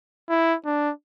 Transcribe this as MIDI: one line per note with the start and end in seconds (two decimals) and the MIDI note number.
0.29 0.55 64
0.65 0.91 62